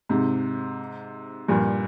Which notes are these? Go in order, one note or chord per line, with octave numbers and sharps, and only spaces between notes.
G#2 C3
G2 A#2